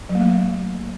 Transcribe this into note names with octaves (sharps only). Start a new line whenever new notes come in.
F#3
A#3
A3